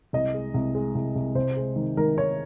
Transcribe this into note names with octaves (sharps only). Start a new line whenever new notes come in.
C2 D#5
G#3
C2
G#3
C2
C2
C3 C5
G#3
D#3
D#3 A#4
D#3 C#5